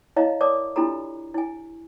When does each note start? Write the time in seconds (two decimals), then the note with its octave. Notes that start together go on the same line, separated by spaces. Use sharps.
0.16 E4 C#5 D#5 F5 A5 A#5
0.40 A#4 C#5 D5 A5 D6 D#6
0.76 D4 E4 F4 G4 A4 A#5
1.34 E4 G#5